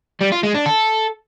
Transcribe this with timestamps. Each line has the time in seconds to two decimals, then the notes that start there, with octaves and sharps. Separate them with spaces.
0.21 G3
0.32 F4
0.43 G#3
0.55 D4
0.66 A4